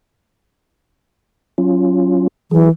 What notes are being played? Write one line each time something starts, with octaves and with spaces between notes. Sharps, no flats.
F#3 C#4 F4
E3 F#3 G#4